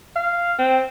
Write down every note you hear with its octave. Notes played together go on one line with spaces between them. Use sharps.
F5
C4